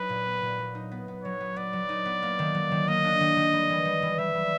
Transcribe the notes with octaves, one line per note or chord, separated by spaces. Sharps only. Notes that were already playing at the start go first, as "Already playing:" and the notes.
Already playing: F#3 D#4 B4
A#2
B3
A#2
F#3
D#4
B3
B3
F#3 C#5
B3
B3 D5
F#3
D#4
B3
A#3
D#3
F#3
D#3
A#3 D#5
D4
D#3
D#3
G3
E3
G3
E3
G3 E5
G3